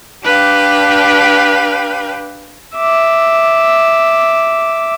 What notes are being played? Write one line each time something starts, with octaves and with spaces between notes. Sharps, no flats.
D4 G4 B4 F5 G5
E5 D6